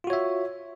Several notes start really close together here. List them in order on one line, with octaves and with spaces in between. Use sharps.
F4 F#4 C#5 E5